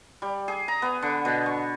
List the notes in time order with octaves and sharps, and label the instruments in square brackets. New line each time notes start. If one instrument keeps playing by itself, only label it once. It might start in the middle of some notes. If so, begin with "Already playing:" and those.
[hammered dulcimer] G3
G#4
A#5
B3
D3
B2
C#6